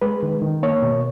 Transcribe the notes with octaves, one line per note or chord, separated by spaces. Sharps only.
G#3 B4
D#3
D#3
A#3 C#5
B2